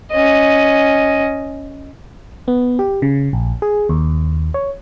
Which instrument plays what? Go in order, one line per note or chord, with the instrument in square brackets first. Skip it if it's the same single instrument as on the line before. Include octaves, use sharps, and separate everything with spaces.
[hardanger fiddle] C#4 D#5
[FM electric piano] B3
G4
C#3
A#1
G#4
D#2
C#5